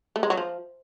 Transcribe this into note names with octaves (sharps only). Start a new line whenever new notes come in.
A3
G#3
F#3
F3